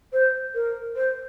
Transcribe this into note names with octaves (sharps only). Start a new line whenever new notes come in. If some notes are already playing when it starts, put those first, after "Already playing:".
C5
A#4
C5